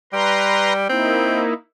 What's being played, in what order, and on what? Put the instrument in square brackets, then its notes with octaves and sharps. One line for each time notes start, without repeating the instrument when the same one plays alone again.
[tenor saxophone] G3 [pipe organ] B4 A#5 C6
[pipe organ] A#3 D#4 E4 [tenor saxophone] C4